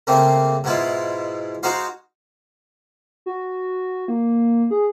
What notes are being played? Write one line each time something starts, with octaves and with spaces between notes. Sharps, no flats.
C#3 A3 A#3 C4
G#2 B2 G#3 E4 F4
G#3 D#4 F#4 C5 F5
F#4
A#3
G#4